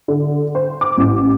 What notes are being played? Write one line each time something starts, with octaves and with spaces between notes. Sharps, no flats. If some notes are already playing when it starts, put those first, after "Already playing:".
D3
C5
D6
A1